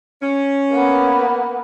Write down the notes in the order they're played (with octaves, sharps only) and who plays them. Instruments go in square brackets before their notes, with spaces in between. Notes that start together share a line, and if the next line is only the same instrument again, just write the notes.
[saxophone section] C#4
[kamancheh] A#3 B3